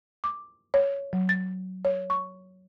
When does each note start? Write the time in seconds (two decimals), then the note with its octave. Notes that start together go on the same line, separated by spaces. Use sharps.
0.24 D6
0.74 C#5
1.13 F#3
1.29 A6
1.85 C#5
2.10 C#6